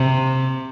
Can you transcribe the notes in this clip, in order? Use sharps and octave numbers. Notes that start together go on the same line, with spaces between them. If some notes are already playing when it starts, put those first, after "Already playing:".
Already playing: C3